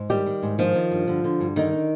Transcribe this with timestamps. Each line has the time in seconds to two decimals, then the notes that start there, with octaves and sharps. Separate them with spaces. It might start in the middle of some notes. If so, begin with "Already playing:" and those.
Already playing: G#2
0.10 D#3 G3 G4
0.26 D#3
0.43 G#2
0.58 D#3 F3 F4
0.75 D#3
0.91 G2
1.08 D3
1.24 D3
1.40 G2
1.56 D3 D#3 D#4
1.73 D3